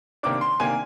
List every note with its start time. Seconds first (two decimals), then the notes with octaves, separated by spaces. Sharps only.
0.23 C3 D#3 A#3 D4 D6
0.41 C6
0.60 C3 D#3 A#3 D4 G#5